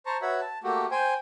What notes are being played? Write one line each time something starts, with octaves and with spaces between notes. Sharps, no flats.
C5 A5 A#5 C#6
F#4 B4 C#5 E5 B5
A5
A3 A#3 F#4 G4
C5 G5 G#5